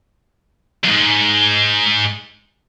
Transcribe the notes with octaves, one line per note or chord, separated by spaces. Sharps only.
F2 G#2